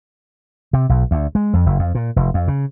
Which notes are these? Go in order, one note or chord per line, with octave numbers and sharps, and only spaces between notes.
C3
B1
D2
G#3
F2
F#1
F2
A#2
F1
F2
C#3